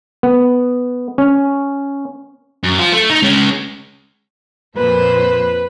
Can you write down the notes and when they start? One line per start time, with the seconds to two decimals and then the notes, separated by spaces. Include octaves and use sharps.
0.23 B3
1.18 C#4
2.64 F#2
2.79 F4 C5
2.93 A3
3.10 D#4
3.23 G#3 C#4
4.77 F2 A#2 B4 C5